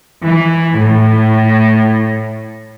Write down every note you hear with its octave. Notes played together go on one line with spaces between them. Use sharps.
E3
A2